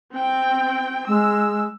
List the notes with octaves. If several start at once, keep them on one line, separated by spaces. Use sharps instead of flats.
C4 G5
G#3 E6